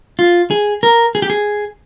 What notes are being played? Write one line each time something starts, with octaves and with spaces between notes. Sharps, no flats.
F4
G#4
A#4
G#4
G4
G#4